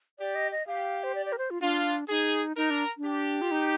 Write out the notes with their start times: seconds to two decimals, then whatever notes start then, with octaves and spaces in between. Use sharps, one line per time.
0.19 G4 D5
0.35 D#5
0.52 D#5
0.67 G4 F5
1.04 C5
1.15 D5
1.26 D5
1.32 A#4
1.38 C5
1.50 F4
1.62 D4 F4
2.09 D#4 G#4
2.57 D#4 A#4
2.70 D4
2.98 D4
3.05 G4
3.42 F4
3.51 D#4